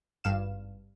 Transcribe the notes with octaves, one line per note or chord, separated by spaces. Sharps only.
G#1 G2 F5 E7